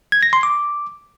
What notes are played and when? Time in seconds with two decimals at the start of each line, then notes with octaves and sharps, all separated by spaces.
0.12 G#6
0.23 A#6
0.33 C6
0.43 D6